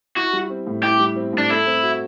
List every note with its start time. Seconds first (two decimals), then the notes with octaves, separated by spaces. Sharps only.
0.16 E4 F#4
0.33 G3
0.50 C4
0.67 A2
0.83 E4 G4
1.00 G3
1.16 C4
1.33 A2
1.38 D4
1.50 E4 A4
1.67 C4
1.83 F#4